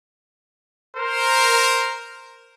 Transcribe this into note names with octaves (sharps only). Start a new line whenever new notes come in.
A#4 C5